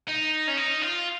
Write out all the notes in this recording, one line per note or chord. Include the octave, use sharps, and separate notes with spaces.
D#4
C#4
D#4
F4